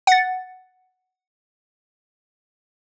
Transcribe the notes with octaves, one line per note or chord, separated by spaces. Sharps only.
F#5 A6